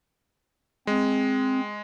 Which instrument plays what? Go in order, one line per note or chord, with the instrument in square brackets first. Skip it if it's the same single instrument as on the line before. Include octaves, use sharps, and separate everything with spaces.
[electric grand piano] G#3 [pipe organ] C4